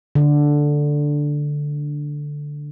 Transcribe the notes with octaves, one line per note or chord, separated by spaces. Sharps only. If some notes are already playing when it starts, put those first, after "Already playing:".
D3